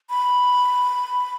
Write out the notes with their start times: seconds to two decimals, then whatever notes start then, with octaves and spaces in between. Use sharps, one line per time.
0.10 B5